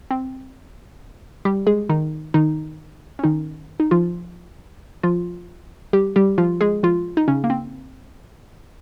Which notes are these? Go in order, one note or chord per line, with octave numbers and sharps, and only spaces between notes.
C4
G3 G4
G#3 G#4
D#3 D#4
D#3 D#4
C#4
D#3 D#4
D#4
F3 F4
F3 F4
G3 G4
G3 G4
F3 F4
G#3 G#4
F3 F4
D#4
C#3 C#4
A#3
C4